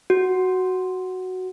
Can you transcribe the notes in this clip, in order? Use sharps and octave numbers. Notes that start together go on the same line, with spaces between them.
F#4